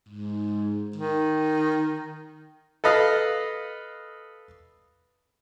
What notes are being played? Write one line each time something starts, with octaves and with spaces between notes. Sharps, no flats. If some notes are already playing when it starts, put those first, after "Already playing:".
G#2
D#3
A4 B4 D#5 F5